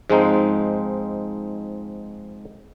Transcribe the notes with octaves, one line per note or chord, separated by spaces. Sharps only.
G#2 F3 G#3 C4 D#4